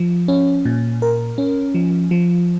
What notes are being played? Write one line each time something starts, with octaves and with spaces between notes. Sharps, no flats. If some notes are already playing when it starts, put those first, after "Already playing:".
Already playing: F3
C#4
A#2
A#4
C#4
F3
F3